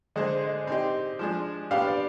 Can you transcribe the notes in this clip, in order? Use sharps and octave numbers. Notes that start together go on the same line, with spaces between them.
D3 G#3 D4 G#4 C5 D#5
D#5
D5
C4 D#4 G4 D#5
F3 G#3 D4
B3 D4 G4 F5
D5